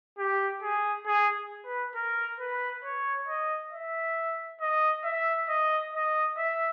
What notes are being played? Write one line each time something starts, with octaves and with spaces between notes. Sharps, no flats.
G4
G#4
G#4
B4
A#4
B4
C#5
D#5
E5
D#5
E5
D#5
D#5
E5